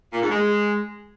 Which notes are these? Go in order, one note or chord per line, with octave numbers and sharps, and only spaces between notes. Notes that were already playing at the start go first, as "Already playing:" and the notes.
A#2
G#2
G#3